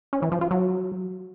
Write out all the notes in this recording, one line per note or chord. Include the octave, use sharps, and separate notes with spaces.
C#4
E3
F3
F4
F#3